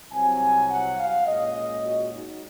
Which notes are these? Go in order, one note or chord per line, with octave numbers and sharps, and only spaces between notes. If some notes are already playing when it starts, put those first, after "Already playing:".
C2 C3 F#3 G#5
F#5
F5
A#2 G#3 C#4 D#5
F#4
D#4